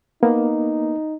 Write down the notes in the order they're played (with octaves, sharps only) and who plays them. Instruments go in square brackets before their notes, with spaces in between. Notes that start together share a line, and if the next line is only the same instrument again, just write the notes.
[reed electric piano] A#3 B3 [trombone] D#4